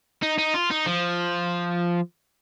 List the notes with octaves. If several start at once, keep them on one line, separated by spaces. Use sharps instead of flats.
D#4
D#4
F4
D#4
F3